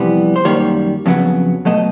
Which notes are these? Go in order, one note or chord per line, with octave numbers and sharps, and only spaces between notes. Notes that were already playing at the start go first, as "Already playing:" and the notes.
Already playing: F2 C3 E3 G3 B3
C5
F#2 D#3 G3 A#3 C#5
F2 C#3 F#3 B3
B2 F#3 A3 D#5